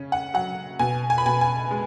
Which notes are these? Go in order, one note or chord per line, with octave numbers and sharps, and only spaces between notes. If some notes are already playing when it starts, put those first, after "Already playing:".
Already playing: C#3 C#4
F#5
F#3 F#5
B2 G#5
G#5
B5
B2 G#5
G#5
G#3